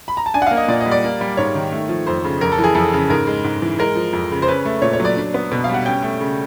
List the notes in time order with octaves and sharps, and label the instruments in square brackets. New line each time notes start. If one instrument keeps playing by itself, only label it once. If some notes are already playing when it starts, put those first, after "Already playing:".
[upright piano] B5
A#5
A5
D4 G#5
F#5
A#3 F5
D#5
A#2 D5
D#5
G3
D5
A#3
G3
G#2 C#5
D#3
A3
F3
F2 C5
C#3
F2 A#4
A4
E3
G#4
F2 A4
C#3
G#2 A#4
G#3
G#2
E3
G#3 A#4
F3
F2
C#3
C5
C#4 B4
A3
A#2 C#5
C#5
F#3
D5
D4
B3
B2
G3 F5
F#5
C#4 G5
A3
C#3